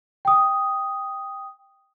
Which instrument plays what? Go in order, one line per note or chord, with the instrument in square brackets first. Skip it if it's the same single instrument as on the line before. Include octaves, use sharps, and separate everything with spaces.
[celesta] G5 D#6